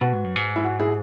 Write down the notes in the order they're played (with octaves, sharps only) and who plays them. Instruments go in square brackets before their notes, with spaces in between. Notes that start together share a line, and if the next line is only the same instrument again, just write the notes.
[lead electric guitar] B2 [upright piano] F#4 B4
[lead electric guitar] G#2
F#2
G#2
[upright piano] E4
F#4
E4 G#4